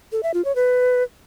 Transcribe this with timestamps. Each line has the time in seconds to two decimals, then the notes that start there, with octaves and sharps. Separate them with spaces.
0.12 A4
0.23 E5
0.34 F4
0.45 C#5
0.55 B4